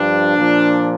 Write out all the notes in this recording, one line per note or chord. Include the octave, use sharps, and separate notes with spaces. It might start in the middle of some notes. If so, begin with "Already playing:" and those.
Already playing: G2 F3 D4
A#2 F3